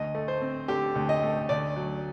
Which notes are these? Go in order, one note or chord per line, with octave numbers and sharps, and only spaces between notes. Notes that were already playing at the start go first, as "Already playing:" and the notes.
Already playing: D2 D#5
A3
C5
C4
D3 G4
D2
D#5
A3
D2 D5
F#3